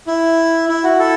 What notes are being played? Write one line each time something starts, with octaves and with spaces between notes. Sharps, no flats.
E4
E4
F#4
E4 A4